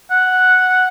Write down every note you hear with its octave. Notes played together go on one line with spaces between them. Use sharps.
F#5